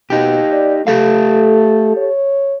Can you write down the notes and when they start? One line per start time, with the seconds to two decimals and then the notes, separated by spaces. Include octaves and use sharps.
0.10 B2 D#4 G4
0.53 D5
0.87 A3 G4 A4 F5
1.97 C#5